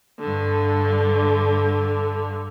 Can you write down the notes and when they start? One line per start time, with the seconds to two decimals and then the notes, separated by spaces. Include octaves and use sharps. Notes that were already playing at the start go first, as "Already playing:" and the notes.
0.20 G2 D3